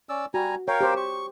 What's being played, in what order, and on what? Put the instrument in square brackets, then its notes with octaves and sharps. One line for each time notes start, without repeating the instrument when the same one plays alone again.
[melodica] C#4 D5 E6
[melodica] G3 G#5 A#5 [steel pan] F#4
[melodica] A#4 F5 G5 [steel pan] C#5
[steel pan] G4 C5
[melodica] C#6